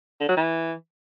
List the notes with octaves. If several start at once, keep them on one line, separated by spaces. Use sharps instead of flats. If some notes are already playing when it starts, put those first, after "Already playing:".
D3
F#3
E3